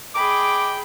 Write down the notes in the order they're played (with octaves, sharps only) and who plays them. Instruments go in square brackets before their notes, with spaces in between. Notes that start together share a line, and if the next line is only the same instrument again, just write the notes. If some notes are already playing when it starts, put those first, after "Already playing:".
[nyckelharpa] G#4 B5 [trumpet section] D#5 G5 [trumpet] D6